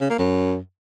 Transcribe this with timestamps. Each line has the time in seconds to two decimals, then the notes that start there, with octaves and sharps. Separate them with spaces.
0.01 C#3
0.10 A#3
0.19 F#2